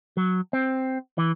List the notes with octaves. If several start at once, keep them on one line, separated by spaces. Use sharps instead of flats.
F#3
C4
E3